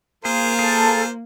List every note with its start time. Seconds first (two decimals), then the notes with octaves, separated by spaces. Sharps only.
0.25 A#3 F4 G#4 A#4 C5
0.59 G#4 A4